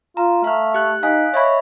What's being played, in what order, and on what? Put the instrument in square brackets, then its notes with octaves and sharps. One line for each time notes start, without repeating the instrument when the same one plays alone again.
[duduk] F4 [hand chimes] A#5
[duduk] A3 [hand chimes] F5 F6
[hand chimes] G4 F#6
[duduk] D#4 [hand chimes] F5 G#5 F#6
[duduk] C#5 [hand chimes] D#5 E5 B5